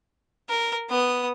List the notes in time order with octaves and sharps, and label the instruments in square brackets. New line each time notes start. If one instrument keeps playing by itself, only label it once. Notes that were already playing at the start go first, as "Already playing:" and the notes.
[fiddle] A#4
B3 D#6